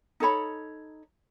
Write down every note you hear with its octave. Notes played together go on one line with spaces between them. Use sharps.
D#4 A4 C#5 B5